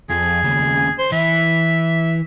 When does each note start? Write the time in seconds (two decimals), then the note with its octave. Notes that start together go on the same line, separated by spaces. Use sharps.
0.10 F2 G#4
0.44 D#2 C#3
0.98 C5
1.12 E3 E5